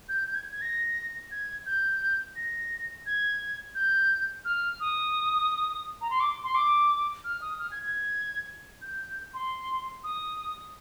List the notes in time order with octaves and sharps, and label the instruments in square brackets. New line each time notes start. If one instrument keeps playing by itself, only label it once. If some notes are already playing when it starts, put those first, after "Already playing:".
[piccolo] G6
G6
G#6
G#6
A#6
G#6
G6
A#6
G#6
G6
F6
D#6
A#5
C6
D6
C6
D6
F6
D#6
F6
G#6
G#6
G6
C6
D#6